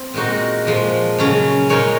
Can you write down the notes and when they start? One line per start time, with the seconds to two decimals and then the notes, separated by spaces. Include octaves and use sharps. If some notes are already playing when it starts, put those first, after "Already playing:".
Already playing: C4
0.14 A#2 G#3 D#4 F#4
0.65 A#2 F3 G#3
1.18 C#3 F#3 C#4
1.69 A#2 G#3 D#4 A#4 C#5